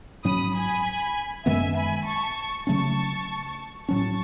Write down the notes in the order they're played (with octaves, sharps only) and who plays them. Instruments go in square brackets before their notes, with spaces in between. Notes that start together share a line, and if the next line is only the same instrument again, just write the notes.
[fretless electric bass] G#2 F#3 C#4 [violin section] B5 D#6
[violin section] G#5 B5
[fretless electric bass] F#2 D#3 G#3 B3 [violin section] E5 G#5
[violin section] G#5 B5
A5 C#6
[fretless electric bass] C#3 F#3 A3 C#4 [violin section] A5 C#6
[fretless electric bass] A2 F#3 C#4 [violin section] A5 C#6